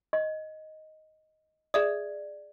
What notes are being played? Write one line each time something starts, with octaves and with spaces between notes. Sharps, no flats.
D#5
G#4 D5 E5 D#6